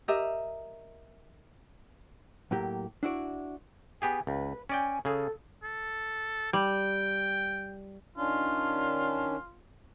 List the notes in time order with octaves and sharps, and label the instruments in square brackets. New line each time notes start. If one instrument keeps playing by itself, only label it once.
[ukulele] G4 A#4 D#5 E5
[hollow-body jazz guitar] A2 F#3 A#3 G4
D4 E4 F#4 D5
[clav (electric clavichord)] B3 G4 G#4 [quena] G#5
[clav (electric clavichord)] C#2 [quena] B4
[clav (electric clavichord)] C#4 D5 G5 [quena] G#5
[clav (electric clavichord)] C#3 G#4 [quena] A4
[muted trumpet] A4
[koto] G3 [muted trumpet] G5
[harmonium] D#3 C#4 D4 [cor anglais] F4